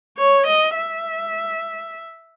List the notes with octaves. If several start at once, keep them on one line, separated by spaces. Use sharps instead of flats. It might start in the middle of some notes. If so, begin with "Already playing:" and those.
C#5
D#5
E5